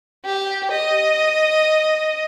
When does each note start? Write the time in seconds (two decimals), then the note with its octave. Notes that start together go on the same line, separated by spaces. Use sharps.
0.25 G4
0.71 D#5